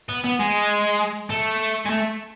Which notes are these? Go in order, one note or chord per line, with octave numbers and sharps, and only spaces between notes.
B3
B3
G#3
A3
G#3
A3